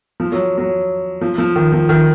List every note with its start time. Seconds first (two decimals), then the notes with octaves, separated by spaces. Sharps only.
0.20 F3
0.32 F#3
0.58 F#3
1.21 F3
1.38 F3
1.56 D#3
1.72 F3
1.89 D#3